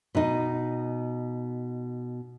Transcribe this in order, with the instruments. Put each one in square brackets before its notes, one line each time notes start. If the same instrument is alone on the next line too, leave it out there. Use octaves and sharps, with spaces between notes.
[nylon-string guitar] B2 D#4